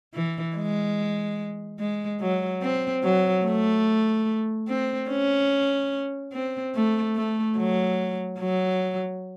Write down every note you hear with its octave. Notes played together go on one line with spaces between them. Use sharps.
E3
G#3
G#3
F#3
C4
F#3
A3
C4
C#4
C4
A3
A3
F#3
F#3